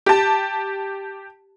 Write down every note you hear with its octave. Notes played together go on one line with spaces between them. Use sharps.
G4 A5